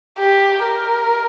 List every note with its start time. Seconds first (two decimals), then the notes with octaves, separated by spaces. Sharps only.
0.19 G4
0.63 A#4